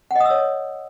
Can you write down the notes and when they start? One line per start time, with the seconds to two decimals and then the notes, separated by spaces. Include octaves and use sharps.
0.11 F#5
0.16 D#5
0.20 D#6
0.25 E6
0.30 C#5